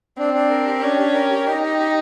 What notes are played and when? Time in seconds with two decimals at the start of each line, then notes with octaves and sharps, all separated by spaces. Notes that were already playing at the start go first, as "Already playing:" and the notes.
0.18 C4 D4
0.34 D4
0.50 A#4
0.66 G4
0.82 C#4 D4
0.99 G4
1.14 A#4
1.31 G4
1.47 D#4 G4
1.63 G4
1.79 G4